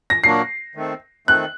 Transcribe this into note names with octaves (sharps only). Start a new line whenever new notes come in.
A#6
A#2 F#3 A#3 D4 F#4 C7
D#3 A3 C4
D#3 A3 C4 F#6